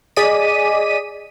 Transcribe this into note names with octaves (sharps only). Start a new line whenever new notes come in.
G#4 D5 D#5 B6 D#7